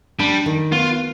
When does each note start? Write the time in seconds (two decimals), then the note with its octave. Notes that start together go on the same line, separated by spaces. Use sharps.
0.19 G3 D4
0.46 D#3
0.72 B3 F4